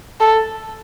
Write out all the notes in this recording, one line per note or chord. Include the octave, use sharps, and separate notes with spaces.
A4